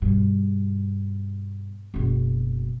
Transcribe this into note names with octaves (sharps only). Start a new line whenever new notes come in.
G2 B2
F#1 B2